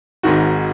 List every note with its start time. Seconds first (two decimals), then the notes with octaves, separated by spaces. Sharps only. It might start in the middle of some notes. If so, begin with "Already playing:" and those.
0.23 G#1 G#2 D#3 F#4